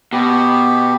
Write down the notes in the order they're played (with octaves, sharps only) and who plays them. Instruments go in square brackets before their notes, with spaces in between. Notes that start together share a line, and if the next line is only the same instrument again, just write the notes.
[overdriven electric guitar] B2 [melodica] G4